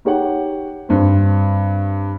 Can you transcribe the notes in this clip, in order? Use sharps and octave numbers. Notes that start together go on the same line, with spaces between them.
D#4 G4 C#5 F#5
G2 C4